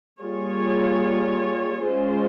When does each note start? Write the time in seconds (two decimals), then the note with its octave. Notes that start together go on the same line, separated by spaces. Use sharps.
0.19 G3 A#3 F4 G#4 C#5
1.86 G#3 C#4 F4 C5